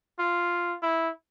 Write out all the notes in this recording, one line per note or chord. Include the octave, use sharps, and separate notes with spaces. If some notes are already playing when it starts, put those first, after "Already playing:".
F4
E4